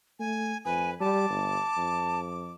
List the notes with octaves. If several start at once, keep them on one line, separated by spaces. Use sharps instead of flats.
A3 G#5
F2 B4 G#5
G3 A5 D6
G1
F2